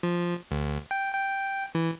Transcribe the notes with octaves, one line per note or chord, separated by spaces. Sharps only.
F3
D2
G5
G5
E3